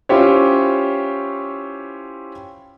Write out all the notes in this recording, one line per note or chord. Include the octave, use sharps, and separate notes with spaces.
C#4 E4 F4 G4 C5 C#5